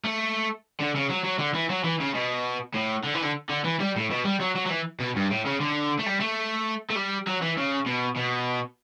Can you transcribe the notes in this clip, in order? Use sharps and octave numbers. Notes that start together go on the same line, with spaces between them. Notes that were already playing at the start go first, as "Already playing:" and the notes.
A3
D3
C#3
F#3
F#3
D3
E3
F#3
E3
C#3
B2
A2
D3
E3
D3
D3
E3
G3
A2
B2
G3
F#3
F#3
F#3
E3
B2
G2
A2
C#3
D3
A3
G3
A3
A3
G3
F#3
E3
C#3
B2
B2